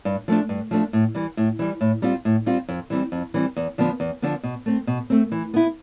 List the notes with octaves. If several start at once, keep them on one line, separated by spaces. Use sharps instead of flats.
G2
F3 A3 D4
G2
F3 A3 D4
A2
E3 G3
A2
E3 G3
A2
G3 C4 F4
A2
G3 C4 F4
F2
E3 G3 C4
F2
E3 G3 C4
E2
D3 F3 B3
E2
D3 F3 B3
B2
A3 C4
B2
A3 C4
E3
B3 E4